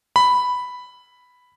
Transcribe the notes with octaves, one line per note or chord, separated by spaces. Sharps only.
B5